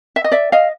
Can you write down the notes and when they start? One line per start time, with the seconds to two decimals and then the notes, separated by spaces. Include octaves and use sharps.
0.16 E5
0.24 D#5
0.32 D5 E5
0.52 D#5 F5